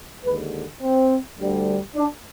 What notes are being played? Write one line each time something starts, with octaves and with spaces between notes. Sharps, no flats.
D#2 D3 G#3 B4
C4
D2 D3 G3
D4